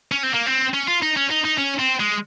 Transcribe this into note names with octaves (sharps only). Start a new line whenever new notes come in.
C#4
C4
A#3
C4
C#4
F4
D#4
C#4
D#4
D#4
C#4
C4
G#3